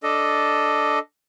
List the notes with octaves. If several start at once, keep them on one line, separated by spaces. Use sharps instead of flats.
D4 A4 D#5